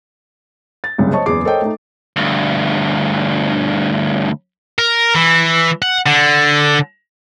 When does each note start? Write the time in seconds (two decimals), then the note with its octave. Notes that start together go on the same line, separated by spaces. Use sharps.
0.84 A6
0.98 F#1 C2 C#3
1.12 C5 C#5 D#5 A5 C#6
1.26 F#1 E2 G#4 D6 C7
1.45 A4 A#4 C5 C#5 D#5 G5
1.62 A3 D#4
2.16 D2 G2
4.78 A#4
5.15 E3
5.82 F#5
6.06 D3